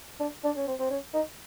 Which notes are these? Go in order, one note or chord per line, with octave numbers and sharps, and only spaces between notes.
D4
D4
C#4
C4
C4
C#4
D#4